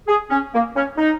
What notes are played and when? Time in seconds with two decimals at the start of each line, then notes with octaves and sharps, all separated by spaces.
0.08 G#4
0.30 C#4
0.53 A#3
0.76 C#4
0.97 D#4